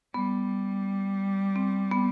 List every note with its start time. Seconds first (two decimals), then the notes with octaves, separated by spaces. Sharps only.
0.14 G3 B3
1.56 C4
1.91 B3